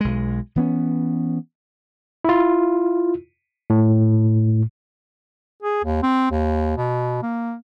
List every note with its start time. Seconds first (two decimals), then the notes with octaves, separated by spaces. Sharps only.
0.01 B1 G#3
0.56 E3 B3 C#4
2.25 E4 F4
3.70 A2
5.63 G#4
5.84 D#2
6.03 C4
6.31 D#2
6.77 B2
7.22 A#3